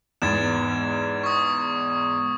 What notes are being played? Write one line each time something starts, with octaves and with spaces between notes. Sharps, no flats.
E2 G#2 G#6 A6 E7
C#6 D#6